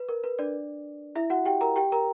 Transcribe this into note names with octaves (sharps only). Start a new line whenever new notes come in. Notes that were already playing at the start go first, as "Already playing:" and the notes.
Already playing: B4
A#4
B4
D4 D5
E4 E5
F#4 F#5
G4 G5
A#4 A#5
G4 G5
A#4 A#5